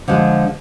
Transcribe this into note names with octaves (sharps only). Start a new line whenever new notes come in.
D3 F3 G#3